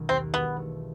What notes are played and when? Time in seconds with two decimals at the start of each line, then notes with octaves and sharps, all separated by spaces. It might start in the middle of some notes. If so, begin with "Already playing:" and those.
Already playing: B1 B2 D#3 G#3 C#4
0.09 D#2 C4
0.34 E1 B3
0.59 A3